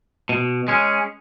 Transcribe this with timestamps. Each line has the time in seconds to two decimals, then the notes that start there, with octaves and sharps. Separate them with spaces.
0.29 B2
0.68 G#3 C#4